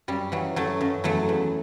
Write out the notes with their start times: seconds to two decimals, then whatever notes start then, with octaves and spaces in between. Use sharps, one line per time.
0.08 F#2 G3
0.32 E3 F#3
0.56 F#2 F#3 A3
0.81 F#2
1.04 E2 F#3 A3
1.29 E2